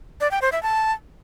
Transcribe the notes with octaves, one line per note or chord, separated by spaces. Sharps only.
D5
G5
C5
E5
A5